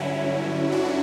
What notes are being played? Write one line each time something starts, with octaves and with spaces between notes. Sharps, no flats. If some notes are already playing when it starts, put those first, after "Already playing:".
Already playing: G2 D3 F#3 C#4 E4
D4 F#4